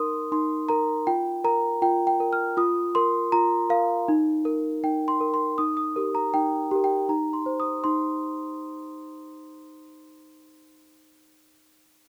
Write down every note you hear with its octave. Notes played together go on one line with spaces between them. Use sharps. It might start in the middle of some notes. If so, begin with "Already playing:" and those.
Already playing: D#4 A#4 C6 D#6
D#4 C6
A#4 A#5
F4 G5
A#4 A#5
F4 G5
G5
A#4
F6
F4 D#6
A#4 C6
F4 A#5
A#4 F5
D#4
A#4
D#4 G5
C6
A#4
C6
D#4 D#6
D#6
G4 A#4
A#5
D#4 G5
G4 A#4
G5
D#4 A#5
C6
C5
D#6
D#4 C6